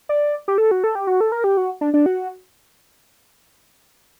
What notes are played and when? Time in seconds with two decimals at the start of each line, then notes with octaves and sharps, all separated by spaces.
0.09 D5
0.48 G4
0.58 A4
0.71 F#4
0.84 A4
0.95 G4
1.07 F#4
1.20 A4
1.32 A#4
1.44 G4
1.57 F#4
1.81 D4
1.94 D4
2.06 F#4